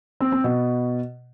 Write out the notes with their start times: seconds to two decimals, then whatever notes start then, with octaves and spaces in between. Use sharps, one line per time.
0.20 C4
0.32 C4
0.44 B2